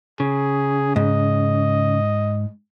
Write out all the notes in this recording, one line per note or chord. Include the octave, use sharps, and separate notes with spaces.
C#3 G#4
G#2 D#5